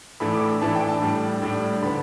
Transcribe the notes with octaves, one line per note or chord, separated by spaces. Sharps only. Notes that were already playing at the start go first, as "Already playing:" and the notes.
A2 E3 A3 D4 B5
D6
B5
A2 E3 A3 D4 A5
G5
A5
A2 G3 D4
A2 G3 D4
D3 B3 D4 B5